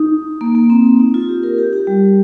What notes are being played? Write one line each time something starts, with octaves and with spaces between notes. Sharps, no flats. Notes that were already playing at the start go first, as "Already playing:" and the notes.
Already playing: D#4
A#3
A#3
C4
D#4
F4
G4
A#4
G4
G4
G3